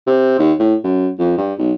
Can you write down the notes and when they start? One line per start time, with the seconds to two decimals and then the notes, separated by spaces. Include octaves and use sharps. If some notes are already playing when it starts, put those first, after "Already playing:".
0.06 C3
0.39 D#2
0.59 A2
0.84 F#2
1.19 F2
1.37 G2
1.59 B1